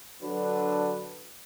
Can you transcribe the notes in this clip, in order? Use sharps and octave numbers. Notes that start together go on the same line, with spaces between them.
D3 F#3 D4 B4